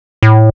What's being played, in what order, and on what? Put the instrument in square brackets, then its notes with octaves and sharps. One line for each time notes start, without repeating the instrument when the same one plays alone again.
[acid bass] A2